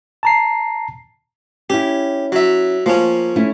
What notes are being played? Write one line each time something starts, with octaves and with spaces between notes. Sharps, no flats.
A5 A#5 C7
C#4 E4 G4
F#3 E5
F3 A#3 C#4
A3 C#4 E4